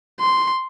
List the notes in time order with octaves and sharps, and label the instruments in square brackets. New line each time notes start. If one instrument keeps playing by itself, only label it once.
[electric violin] C6